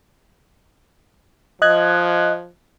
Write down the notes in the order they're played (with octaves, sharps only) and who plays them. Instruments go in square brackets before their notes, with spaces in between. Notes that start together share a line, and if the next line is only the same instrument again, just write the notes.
[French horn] F3 [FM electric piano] D#5 F#6 G#6